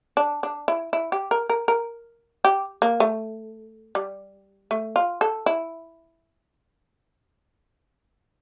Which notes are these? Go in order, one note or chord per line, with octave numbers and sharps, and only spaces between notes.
D4
D4
E4
E4
G4
A#4
A#4
A#4
G4
A#3
A3
G3
A3
F4
A4
E4